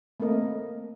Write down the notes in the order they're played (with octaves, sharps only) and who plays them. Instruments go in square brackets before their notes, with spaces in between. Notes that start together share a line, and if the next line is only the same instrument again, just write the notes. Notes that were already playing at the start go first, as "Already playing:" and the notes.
[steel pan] A3 A#3 C4 A#4 D#5